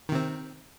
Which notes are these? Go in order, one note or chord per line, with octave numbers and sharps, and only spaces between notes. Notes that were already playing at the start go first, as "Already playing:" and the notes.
C3 D#3 C4